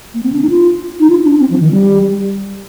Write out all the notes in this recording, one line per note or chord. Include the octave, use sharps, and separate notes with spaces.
A#3
C4
D4
D#4
F4
D#4
F4
D4
C4
F3
D#3
G3